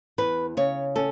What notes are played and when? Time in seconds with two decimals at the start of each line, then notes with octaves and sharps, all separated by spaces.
0.18 E2 B4
0.57 C#3 C#5
0.96 C#4 A4